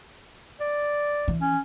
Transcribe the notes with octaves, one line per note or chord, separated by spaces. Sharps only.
D5
E3
C#4